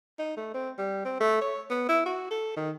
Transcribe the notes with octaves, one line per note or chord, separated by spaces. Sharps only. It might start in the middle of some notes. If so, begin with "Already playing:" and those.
D#4
A3
C4
G3
C4
A3
C#5
B3
E4
F#4
A4
D#3